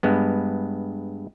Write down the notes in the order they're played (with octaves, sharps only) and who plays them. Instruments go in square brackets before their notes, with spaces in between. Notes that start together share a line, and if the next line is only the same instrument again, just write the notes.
[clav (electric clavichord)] G2 G#3 B3